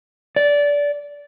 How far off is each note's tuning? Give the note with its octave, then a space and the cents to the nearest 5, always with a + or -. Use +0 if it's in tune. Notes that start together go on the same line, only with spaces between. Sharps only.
D5 -20